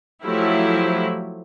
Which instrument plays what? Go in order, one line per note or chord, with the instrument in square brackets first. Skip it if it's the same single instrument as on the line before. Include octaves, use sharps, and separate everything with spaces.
[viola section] F3 F#3 A3 E4 G4